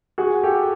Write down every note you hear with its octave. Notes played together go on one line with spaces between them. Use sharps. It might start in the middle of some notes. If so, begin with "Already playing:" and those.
F#4 G#4
G4 A4